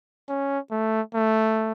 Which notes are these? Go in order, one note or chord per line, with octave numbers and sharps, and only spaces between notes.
C#4
A3
A3